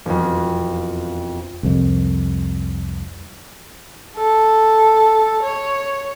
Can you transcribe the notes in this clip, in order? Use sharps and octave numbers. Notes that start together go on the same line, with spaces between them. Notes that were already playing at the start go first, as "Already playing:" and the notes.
E1 F2
C2 F2
A4
C#5